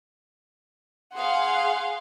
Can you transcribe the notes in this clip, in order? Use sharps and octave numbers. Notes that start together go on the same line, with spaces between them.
G#4 F5 F#5 C6